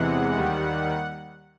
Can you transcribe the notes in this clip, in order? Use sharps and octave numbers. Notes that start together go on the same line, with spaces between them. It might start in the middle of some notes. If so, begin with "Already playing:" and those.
Already playing: E2 C3 E3 G#3 F#5
D#2 D#3 G3